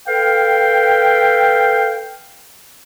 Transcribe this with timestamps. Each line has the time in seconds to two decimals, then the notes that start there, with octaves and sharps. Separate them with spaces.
0.07 A4 B4 F5 G5